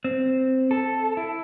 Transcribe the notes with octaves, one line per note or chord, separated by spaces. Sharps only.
C4
A4
E4